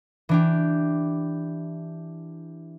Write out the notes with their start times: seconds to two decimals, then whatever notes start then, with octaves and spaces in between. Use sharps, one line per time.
0.29 E3 D4 G4